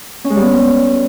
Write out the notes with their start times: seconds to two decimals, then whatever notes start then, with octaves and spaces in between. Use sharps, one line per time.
0.24 C#4
0.30 G#3
0.36 G3
0.42 B3